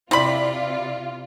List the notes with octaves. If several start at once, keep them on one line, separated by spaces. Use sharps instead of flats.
C3 C4 E4 F4 D5 B5 B6